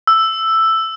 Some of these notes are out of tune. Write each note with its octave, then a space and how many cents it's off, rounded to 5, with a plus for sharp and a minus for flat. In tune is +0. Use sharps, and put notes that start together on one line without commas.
E6 +5